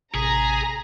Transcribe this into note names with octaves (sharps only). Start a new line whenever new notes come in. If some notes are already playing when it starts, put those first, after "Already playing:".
A1 C3 G#4 A#5 B6